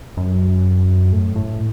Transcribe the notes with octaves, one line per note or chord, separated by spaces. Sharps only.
F#2
A2
A2